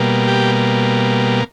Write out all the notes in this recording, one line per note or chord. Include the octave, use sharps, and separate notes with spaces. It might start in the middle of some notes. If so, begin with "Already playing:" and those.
Already playing: B2 G3 A#3
G4